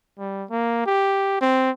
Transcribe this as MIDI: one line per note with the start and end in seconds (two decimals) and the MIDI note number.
0.19 0.45 55
0.50 0.83 58
0.86 1.37 67
1.41 1.71 60